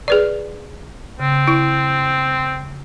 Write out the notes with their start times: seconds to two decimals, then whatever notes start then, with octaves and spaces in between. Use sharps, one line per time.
0.08 G#4 B4 D5
1.20 C#3 C4
1.47 E4